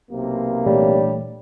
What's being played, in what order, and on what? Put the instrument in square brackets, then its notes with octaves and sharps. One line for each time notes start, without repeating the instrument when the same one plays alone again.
[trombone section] B1 C3 A#3
[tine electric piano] A#2 E3 A3 [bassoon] G3 [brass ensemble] D4 G4 C#5